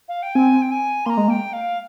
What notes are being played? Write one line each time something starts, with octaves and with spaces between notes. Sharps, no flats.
F5
G5
C4 G#5
G5
G#5
A#3 A#5 C6
G#3
A#3 G5
F5